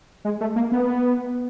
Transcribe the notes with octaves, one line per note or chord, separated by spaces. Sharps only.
G#3
A3
A#3
B3